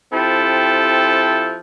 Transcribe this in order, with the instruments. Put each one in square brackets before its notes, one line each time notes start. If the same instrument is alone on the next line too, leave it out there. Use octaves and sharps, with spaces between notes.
[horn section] F3 C4 E4 G4 A4